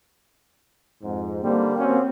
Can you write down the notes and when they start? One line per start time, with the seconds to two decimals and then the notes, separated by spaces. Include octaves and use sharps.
1.03 F2 G#2
1.43 D3 G3 A#3 C4
1.79 C4 C#4 F#4